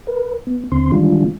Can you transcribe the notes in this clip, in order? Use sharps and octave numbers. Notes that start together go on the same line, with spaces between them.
A#4 B4
B3
D#2 D3 C4 C6
D#3 E3 G3 G#3 D4 F4